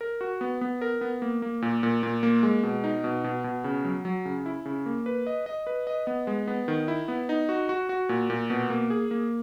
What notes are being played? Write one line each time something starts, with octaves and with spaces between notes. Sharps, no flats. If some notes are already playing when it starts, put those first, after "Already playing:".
A#4
F#4
B3
B3
A#4
B3
A#3
A#3
A#2
A#2
A#2
A#3
G#3
B2
D#4
B2
B2
B2
C#3
F#3
F#3
C#3
E4
C#3
A#3
B4
D#5
D#5
B4
D#5
B3
G#3
B3
D#3
E4
B3
D#4
F#4
F#4
F#4
A#2
A#2
B2
A#3
G#4
A#3